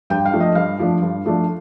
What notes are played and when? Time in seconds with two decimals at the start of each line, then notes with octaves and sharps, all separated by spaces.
0.10 G2 G5
0.25 F5
0.33 F3 A3 D4
0.40 D#5
0.55 G2 F5
0.79 F3 A3 D4
1.02 G2
1.25 F3 A3 D4